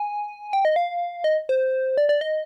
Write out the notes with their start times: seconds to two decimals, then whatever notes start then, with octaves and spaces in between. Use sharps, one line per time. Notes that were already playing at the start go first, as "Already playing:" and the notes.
Already playing: G#5
0.53 G5
0.65 D#5
0.76 F5
1.24 D#5
1.49 C5
1.98 D5
2.09 D5
2.21 D#5